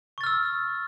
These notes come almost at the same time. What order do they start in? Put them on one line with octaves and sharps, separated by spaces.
C#6 A6 F6 E6